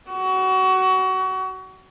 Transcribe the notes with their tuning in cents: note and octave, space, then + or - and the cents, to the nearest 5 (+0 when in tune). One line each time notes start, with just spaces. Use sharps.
F#4 +25